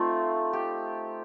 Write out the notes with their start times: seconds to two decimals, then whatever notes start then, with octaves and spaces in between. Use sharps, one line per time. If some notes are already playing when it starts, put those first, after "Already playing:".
Already playing: A3 C4 D#4 F4
0.53 G4